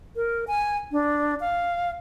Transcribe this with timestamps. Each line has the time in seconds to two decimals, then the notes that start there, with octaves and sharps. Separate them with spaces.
0.16 A#4
0.48 G#5
0.92 D4
1.40 F5